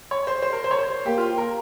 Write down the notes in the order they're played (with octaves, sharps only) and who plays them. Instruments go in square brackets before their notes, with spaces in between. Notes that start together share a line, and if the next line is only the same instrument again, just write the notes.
[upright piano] C#5
C5
C5
A#4
C5
C#5
C5
[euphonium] A#3 [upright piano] G4
[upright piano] F4
A#4